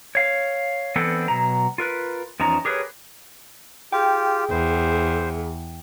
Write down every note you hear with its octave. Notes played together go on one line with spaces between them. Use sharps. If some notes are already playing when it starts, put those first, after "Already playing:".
C#5 F5
E3 B3 C4 D4 A4 F#5
B2 F#3 A#5
F4 A#4 B4
E2 F3 C#4 D#4 A#5
G4 G#4 A#4 B4 C#5
F4 G4 G#4 G5
E2 C5